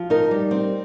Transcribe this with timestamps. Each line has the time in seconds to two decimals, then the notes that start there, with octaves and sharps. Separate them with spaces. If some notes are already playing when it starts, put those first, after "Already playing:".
Already playing: F3
0.10 D#4 A#4
0.31 G3
0.51 C4